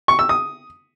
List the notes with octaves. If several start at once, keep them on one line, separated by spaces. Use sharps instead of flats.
C#6
E6
D#6